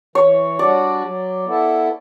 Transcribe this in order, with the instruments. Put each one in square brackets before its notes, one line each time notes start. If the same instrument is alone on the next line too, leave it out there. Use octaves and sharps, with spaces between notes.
[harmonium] E3 [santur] C#5
[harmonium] G3 D4 F#4 [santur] D5
[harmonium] F#3
B3 E4 A4